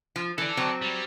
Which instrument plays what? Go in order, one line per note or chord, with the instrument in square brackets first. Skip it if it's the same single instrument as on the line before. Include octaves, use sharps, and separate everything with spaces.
[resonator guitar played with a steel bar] F3
[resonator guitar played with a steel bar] E3 [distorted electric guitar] A4 D5
[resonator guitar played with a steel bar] F#3 C4
[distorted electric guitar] G3